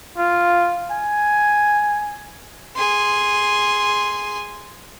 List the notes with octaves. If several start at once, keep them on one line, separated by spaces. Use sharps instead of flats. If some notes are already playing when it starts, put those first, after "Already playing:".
F4
G#5
G#4 C6